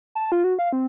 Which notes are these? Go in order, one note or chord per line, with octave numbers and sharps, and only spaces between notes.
A5
F4
F#4
F5
C4